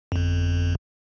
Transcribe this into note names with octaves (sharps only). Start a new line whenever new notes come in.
G1 F2